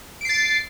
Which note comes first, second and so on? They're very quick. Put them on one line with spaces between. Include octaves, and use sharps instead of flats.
D7 C7 A6